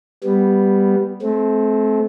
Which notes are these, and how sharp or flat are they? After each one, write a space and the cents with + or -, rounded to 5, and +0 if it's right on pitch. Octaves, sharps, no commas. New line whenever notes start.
G3 +0 B3 +0
A3 -35 C4 +0